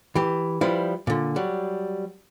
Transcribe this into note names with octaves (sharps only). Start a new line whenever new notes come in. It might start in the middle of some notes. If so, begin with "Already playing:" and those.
E3 G4
F3 G3 E4 B4
A#2 D3
F#3 G3